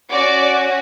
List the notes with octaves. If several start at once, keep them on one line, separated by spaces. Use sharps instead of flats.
C#4 F#4 D5